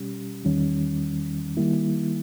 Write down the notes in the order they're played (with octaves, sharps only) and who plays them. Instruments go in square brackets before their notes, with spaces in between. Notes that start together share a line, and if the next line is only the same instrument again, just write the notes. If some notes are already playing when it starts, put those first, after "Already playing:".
Already playing: [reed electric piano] B2 G3 C#4 G4
E2 D#3 G3 C#4
D#3 G3 A#3 E4